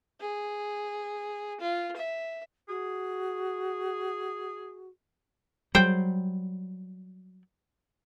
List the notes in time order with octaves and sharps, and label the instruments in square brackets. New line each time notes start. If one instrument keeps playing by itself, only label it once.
[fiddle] G#4
F4
E5
[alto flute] F#4 [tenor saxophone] G#4
[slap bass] F#3 G3 [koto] C5 G5